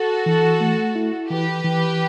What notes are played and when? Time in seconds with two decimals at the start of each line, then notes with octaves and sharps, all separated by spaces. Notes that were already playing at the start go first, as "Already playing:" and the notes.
Already playing: F#4 A4
0.26 E3
0.60 A3
0.95 E4
1.30 E3 G4 B4
1.64 E3